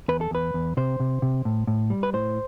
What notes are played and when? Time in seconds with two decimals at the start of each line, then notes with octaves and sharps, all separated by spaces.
0.08 E2 B4
0.21 A4
0.31 E2 B4
0.54 E2
0.77 C3 C5
1.00 C3
1.22 C3
1.45 A2
1.67 A2
1.90 G3
2.03 B4
2.13 A2 C5